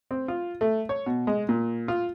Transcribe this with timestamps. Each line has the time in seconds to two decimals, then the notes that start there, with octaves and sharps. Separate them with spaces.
0.11 C4
0.28 F4
0.61 A3
0.89 C#5
1.06 B2
1.27 G#3
1.49 A#2
1.88 F4